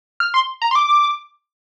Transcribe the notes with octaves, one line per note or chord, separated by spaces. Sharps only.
F6
C6
A#5
C6
D6